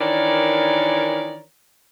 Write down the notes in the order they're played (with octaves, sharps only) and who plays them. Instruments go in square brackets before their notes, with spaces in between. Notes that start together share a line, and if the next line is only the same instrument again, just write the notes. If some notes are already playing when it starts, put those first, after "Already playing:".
[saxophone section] D#3 E3 D4 A#4 C#5 D5